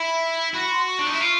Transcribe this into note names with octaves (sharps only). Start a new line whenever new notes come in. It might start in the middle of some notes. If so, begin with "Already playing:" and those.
Already playing: E4 B5
F#4 B5
C6
C#6
D4
D#4
E4
F4